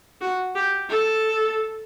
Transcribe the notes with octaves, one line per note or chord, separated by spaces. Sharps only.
F#4
G4
A4